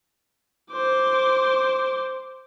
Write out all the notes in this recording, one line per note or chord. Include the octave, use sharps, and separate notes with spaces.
C5 D6